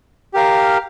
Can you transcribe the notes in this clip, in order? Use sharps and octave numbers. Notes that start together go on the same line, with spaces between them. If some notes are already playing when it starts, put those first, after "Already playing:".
G4 A#4 F5